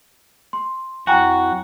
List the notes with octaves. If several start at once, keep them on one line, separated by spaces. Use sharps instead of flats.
C6
F2 F#3 E4 F#4 G5 G#5 A#5